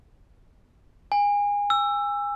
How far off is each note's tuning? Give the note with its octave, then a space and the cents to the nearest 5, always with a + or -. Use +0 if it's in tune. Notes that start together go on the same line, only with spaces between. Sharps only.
G#5 -25
E6 +15